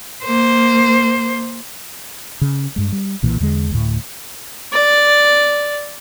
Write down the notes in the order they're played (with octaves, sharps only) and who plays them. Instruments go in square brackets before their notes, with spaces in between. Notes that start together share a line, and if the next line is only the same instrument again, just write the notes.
[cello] A#3 C5
[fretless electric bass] C#3
G2 G#3
G3
B1 A#2 E3
E2 D3 G#3
D2 A2
[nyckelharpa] D5